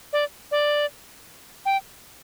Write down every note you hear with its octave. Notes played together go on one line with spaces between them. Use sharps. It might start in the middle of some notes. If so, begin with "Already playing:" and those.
D5
D5
G5